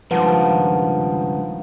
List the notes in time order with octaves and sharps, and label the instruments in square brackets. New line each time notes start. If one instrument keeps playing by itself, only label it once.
[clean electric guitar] C#2 G2 D#3 [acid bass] F3 [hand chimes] B4 F#5 A5